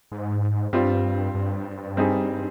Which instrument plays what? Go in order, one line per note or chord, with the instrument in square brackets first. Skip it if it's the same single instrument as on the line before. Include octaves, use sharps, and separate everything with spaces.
[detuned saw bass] G#2
[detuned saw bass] G2 [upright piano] G3 C4 F4
[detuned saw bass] G2
[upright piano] G3 C4 D#4 G#4